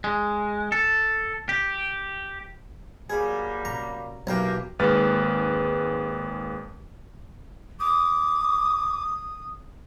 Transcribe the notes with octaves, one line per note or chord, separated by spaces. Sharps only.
G#3
A4
G4
F#3 G3 A#3 G#4
C3 C#4 A#5
B1 E3 F#3 A#3 G4 A#4 G5
G#1 D#2 G#3 B4 F6 A6
D6 D#6